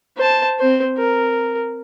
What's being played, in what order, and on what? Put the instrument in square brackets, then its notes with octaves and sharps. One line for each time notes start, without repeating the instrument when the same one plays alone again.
[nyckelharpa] C5 A5
C4 C5
A#4